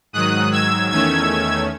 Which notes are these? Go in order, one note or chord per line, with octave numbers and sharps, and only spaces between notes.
G#2 D#3 F#3 D#6 F#6
E6 G#6
E2 D#3 A3 C#4 E6 G#6